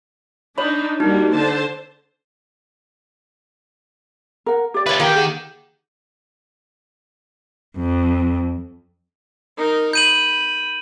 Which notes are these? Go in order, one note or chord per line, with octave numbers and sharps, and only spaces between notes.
D4 D#4 C#5 B5
G3 A#3 D#4 F#4
D3 C5 A5
A#4 F#5
G4 D5
F4 B4 C#5 E5
D#3 A#3 G4 A#4 G5
G#4 F#5
F2
D#4 A#4
B5 G6 D#7 F#7